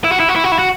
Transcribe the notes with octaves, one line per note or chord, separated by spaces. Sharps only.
E4
F#4
E4
F#4
E4
F#4
E4
F#4